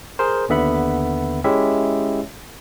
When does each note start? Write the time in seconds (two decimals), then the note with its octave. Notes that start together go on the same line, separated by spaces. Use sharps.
0.19 G#4 A#4 C5
0.49 D#2 D3 B3 E5 F#5 B5
1.44 G#3 C#4 E4 G4 E5